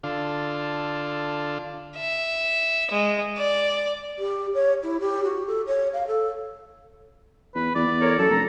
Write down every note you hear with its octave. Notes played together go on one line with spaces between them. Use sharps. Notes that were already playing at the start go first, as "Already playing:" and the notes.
D3 D4 F4 A4 F5
E5
G#3
D5
G4
C#5
E4
G4
F#4
A4
C#5
F5
A4
E2 B4
E2 D5
E2
A4 A#4 C#5
F#2 A4
F1 A#5